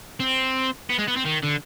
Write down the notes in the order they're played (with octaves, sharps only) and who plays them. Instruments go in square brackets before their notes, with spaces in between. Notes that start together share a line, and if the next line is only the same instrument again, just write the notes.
[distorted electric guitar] C4
B3
G#3
B3
C4
D#3
D3